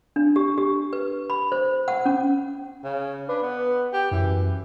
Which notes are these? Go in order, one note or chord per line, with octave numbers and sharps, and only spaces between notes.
D4
G4
G4
B4
B5
C5
F#5
C#4
C#3
D4 B4
B3
G4
F#2 E3